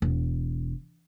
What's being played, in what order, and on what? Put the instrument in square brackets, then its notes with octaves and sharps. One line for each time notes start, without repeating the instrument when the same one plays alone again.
[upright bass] E1